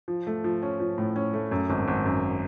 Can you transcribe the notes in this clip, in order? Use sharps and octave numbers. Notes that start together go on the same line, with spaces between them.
F3
A3
F3
C#4
F3
A2
C#4
A3
F#2
G#1
G#1
F#2